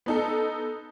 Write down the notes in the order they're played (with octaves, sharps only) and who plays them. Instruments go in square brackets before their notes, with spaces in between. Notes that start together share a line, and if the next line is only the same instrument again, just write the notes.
[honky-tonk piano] B3 D#4 A4